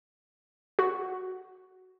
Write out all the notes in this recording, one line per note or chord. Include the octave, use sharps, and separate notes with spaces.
F#4